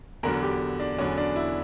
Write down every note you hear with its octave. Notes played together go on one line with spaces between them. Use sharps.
E2 D3 F#3 A#4
G4
D4
E2 D3 F#3 C#4
D4
E4